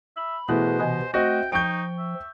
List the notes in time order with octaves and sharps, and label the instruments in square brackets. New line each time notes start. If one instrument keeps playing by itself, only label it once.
[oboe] E5 [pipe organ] B5
[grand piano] B2 [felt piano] E3 A3 [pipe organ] E4 G#4 B4 [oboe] C5
[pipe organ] C3 E3 [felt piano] D#5 G#5
[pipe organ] A3 [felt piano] C4 [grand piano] F#4 D#5 [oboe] G5
[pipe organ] F3 [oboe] D#4 [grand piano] G5 G6 [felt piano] C#6 D7
[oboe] E5